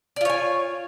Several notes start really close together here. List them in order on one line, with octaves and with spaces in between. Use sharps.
D5 F4 C#5 G#5